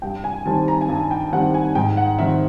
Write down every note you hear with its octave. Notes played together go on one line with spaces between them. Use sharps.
G2 G5
G#5
D#3 G3 C4 A5
A#5
G#5
G2 A5
G5
D#3 G3 C4 F#5
G#5
G#2 G5
F#5
D#3 G3 C4 E5